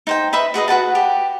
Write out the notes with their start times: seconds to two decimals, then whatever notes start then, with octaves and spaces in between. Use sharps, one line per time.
0.07 D#4 C5 G5
0.33 B4 D#5 E5 B5
0.54 F#4 G#4 B4 D#5
0.68 F#4 B4 F#5 A5
0.95 G4